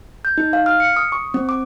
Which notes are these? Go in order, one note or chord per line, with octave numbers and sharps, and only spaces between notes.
G6
D#4
F5
F6
C#7
D#6
C#6
C4
D6